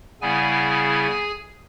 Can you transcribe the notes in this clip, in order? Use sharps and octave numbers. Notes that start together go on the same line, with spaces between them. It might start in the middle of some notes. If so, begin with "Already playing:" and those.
C#3 G3 B3 E4 G#4 G#5